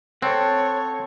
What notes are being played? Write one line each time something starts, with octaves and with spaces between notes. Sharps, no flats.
C4 A4 C#5 F#5